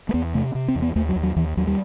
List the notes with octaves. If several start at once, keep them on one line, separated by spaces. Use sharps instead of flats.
A3
E2 B3
C3 A3
C3
C4
E2
B3
D#2 A3
F#3
D#2
F#3
D#2 E3
D#2 F#3
G3